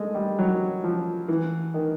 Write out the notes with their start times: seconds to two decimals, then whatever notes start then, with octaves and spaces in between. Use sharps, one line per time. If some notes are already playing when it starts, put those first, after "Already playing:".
Already playing: G#3 A3
0.15 G3
0.39 F#3
0.84 F3
1.28 E3
1.74 D#3